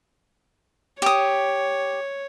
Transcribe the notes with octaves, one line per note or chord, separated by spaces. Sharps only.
G4 C#5 D#6